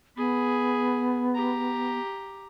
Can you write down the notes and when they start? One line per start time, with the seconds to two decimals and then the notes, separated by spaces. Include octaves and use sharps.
0.17 B3 G#4 B5
1.35 G4 A#5